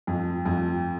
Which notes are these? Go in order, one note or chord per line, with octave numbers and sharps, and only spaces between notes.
F2
F2